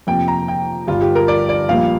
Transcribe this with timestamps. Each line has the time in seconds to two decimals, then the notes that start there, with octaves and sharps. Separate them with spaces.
0.07 F2 C3 A#3 G5
0.28 A#5
0.48 G5
0.87 G1 G2 G3 F4
1.02 G4
1.15 A#4
1.28 D5
1.49 D5
1.69 A#1 A#2 G3 A#3 F5